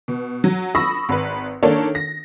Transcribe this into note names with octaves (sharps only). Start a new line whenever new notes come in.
B2
F#3
B5 C#6 D#6 E6 A#6
G#1 B4
D#3 A#3 D4 A4 C#5
A#6